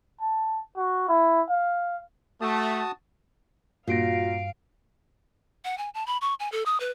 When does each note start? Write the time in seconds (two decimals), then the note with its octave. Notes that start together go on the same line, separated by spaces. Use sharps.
0.21 A5
0.77 F#4
1.08 E4
1.49 F5
2.41 A3 F#4 A5 D#6
3.87 G2 A#2 F4 F#4 F5 A#6 C7 D7
5.65 F#5
5.78 G#5
5.94 A5
6.06 B5
6.21 C#6
6.40 G#5
6.52 A4
6.66 D#6
6.80 B4